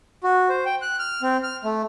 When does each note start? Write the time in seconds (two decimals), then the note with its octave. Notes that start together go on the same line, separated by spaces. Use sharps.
0.24 F#4
0.49 C5
0.65 G5
0.82 F#6
0.99 F6
1.23 C4
1.43 F6
1.65 A3